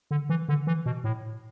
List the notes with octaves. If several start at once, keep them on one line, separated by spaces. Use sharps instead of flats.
D3
E3
D3
E3
B2
A2